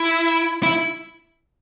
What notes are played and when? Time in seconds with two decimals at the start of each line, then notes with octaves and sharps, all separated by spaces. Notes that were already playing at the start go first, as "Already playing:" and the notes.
Already playing: E4
0.63 E4